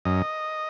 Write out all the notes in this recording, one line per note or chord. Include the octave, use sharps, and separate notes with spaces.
F#2 D#5